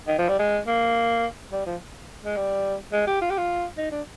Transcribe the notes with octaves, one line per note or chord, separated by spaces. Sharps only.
D#3
F3
G3
G#3
A#3
G3
F3
G#3
G3
G#3
G4
F4
G4
F4
D#4
D4